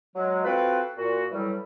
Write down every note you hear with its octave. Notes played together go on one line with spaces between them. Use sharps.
F#3 G#3
C4 F4 F#4 A4 B4
A#2 F#4
A2 E3 F#3 G3